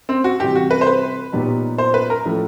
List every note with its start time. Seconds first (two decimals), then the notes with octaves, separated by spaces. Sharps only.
0.09 C4
0.24 F#4
0.40 C3 E3 G3 C4 G4
0.55 F#4
0.71 B4
0.81 C5
0.87 B4
1.32 A#2 F#3 B3 D#4 G4
1.78 C5
1.94 B4
2.10 A#4
2.25 A2 F3 A3 C#4